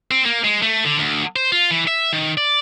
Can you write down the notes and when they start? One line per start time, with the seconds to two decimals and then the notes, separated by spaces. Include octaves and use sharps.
0.11 C4
0.26 A#3
0.45 G#3
0.62 A3
0.85 D3
0.99 D2
1.36 C5
1.52 F4
1.71 E3
1.87 E5
2.13 D#3
2.37 D5